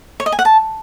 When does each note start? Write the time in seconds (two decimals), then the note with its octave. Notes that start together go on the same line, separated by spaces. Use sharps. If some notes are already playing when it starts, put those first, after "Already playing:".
0.20 C#5
0.26 D#5
0.32 G#5
0.39 F#5
0.45 A5